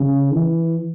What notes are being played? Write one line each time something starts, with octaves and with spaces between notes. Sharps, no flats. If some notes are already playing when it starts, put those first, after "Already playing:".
Already playing: C#3
E3